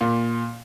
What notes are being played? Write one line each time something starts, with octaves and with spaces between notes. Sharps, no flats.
A#2